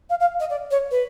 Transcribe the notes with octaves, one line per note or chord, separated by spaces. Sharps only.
F5
F5
D#5
D5
C#5
B4